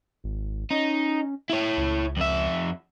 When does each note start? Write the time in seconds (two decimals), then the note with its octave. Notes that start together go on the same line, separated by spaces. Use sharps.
0.24 G#1
0.70 C#4 D#4
1.50 E4 C#5
1.77 C#2
2.17 F2 E5